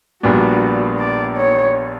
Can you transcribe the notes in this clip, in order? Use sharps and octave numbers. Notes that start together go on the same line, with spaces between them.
A#1 A#2 G3 B3 D4 F#4
D5
C#5